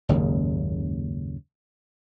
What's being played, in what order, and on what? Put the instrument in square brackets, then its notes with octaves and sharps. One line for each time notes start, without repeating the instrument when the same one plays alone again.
[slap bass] F#1 D#2 G#2 C#3